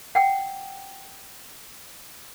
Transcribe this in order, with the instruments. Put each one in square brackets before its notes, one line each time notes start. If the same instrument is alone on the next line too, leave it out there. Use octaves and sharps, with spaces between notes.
[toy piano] F#5 G5